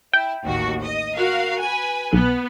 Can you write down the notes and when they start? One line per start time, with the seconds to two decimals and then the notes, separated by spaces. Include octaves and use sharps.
0.13 E4 G5
0.45 A1 D#2 F#4
0.83 D#5
1.15 F#4 A#4 F5
1.62 B4 G#5
2.13 B1 B3